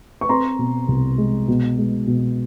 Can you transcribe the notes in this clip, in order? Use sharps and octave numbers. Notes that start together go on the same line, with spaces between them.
C#6
C4 A#5 C6
B2
C2
G#3
B2
G#3
B2